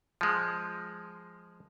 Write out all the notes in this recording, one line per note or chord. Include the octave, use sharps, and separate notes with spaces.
F3 G#3